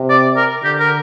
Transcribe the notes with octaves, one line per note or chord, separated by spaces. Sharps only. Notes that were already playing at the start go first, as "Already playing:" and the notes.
Already playing: C3
D5
A#4
D3 G4
A#4